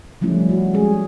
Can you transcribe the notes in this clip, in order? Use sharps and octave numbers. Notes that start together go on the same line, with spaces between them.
F3 G3 A3 C#4 E4
F#4
G#3 C#4 G#4